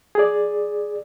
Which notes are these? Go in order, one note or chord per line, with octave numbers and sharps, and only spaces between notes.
G#4 D5